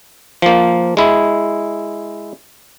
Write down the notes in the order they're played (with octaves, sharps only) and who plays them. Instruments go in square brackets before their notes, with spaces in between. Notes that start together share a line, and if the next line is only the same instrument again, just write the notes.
[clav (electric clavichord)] F3 A#3
G#3 E4